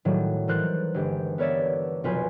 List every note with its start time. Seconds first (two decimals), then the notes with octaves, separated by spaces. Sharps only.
0.05 A2 D#3 F#3 G3
0.48 E3 A#4 C5 F#6 A6
0.94 G1 G#3 G4
1.38 B3 A#4 C#5 D5 E5
2.04 F1 B1 F4 B4 C5 G#5